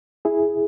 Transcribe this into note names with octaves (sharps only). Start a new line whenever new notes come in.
E4 G#4